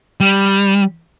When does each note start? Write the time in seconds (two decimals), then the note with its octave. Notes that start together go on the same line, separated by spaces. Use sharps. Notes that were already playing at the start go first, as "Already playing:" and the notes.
0.20 G3